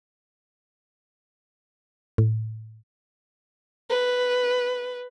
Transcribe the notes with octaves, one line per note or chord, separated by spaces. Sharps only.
A2
B4